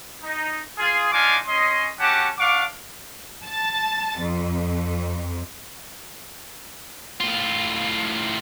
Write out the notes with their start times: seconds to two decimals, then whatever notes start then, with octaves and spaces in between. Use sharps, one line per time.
0.24 D#4
0.79 F4 G#4
1.12 D4 D#4 F4 F5 G#5 D6
1.48 C#4 D#5 C6
2.00 C#4 F#4 G4 F#5 A5 D6
2.39 D4 F5 F#5 C#6 D6
3.45 A5 A6
4.20 F2
7.21 A2 F4